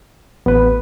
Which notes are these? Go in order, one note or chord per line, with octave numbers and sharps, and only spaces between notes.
A1 B3 B4